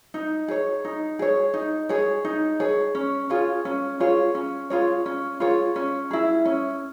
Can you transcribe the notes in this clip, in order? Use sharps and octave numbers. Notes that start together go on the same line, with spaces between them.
D#4
G#4 C#5
D#4
G#4 C#5
D#4
G#4 C#5
D#4
G#4 C#5
C#4
F4 G#4 C#5
C#4
F4 G#4 C#5
C#4
F4 G#4 C#5
C#4
F4 G#4 C#5
C#4
E4 G#4
C#4